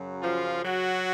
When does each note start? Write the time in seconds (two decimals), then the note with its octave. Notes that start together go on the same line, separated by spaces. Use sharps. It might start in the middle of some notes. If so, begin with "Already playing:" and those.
Already playing: F#2 C#3 F#3
0.21 F3 F4
0.64 F#3 F#4